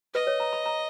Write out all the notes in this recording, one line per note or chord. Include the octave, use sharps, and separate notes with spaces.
B4 D#5
C#5
A#5
B5
A#5